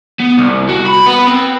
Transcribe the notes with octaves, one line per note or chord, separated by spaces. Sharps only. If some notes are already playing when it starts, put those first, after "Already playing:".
B3
C2
F#4
B5
B3
C4